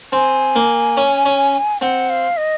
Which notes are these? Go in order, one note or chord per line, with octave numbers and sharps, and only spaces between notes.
C4 G#5
A#3
C#4
C#4
C4 F#5
F5
D#5